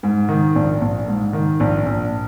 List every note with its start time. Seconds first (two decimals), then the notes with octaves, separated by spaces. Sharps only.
0.03 G#2
0.29 D#3
0.55 A#1
0.81 A#1
1.08 G#2
1.33 D#3
1.60 A#1
1.86 A#1